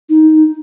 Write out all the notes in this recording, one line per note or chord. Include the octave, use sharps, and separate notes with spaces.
D#4